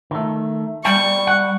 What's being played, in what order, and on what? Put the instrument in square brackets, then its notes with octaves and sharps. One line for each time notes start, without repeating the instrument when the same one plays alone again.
[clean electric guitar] D#3 A3
[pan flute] G3 [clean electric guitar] G5 [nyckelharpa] C#6
[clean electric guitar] F#5